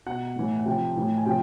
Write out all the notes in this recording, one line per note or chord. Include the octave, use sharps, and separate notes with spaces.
B2 F#5
A2 E3
F#5
C3 F3 G5
A2 E3
G#5
C3 F3 G5